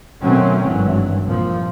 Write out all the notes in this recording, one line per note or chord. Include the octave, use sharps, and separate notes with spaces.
B2 D#3 F#3 A3 C4 C#4
G#1 G2 E3 F#3
C2 A#2 F3